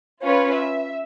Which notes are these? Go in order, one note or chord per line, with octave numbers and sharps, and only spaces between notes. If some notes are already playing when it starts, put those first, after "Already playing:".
C#4 F4 B4 C#5
E5